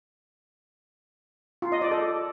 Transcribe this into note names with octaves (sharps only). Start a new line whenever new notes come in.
F4
D#5
D5
A4